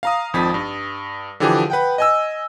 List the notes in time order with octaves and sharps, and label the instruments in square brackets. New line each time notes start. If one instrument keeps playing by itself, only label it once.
[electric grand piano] F5 A#5 D#6
G#1 F2 F3 A6 B6
G2
D3 E3 F3 G4 G#4
B4 F#5 G5
D#5 G#5 E6